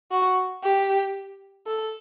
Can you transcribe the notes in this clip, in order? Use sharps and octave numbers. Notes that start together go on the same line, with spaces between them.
F#4
G4
A4